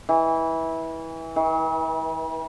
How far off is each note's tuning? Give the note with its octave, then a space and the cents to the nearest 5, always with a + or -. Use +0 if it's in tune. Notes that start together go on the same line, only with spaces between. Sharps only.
E3 -20
E3 -45